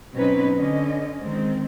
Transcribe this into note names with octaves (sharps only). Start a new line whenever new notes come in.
B2 F#3 C4 C#4 D#4 B4
D3 C#4 D#5
D#3 G#3 C4